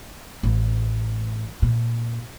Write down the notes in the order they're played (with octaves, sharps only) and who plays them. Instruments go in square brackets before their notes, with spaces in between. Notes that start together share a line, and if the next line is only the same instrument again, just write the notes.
[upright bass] A1
A#2